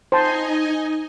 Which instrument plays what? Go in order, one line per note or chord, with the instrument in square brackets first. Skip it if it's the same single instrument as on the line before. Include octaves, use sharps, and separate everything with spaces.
[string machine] D#4 D#5 G#5 [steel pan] C5 A5